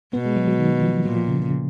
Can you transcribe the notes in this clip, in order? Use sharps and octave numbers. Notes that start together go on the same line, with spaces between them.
B2 B3
G#3
F#3
F#3
D#3
F3
A#2 F#3
F3
C#3
C#3
C#3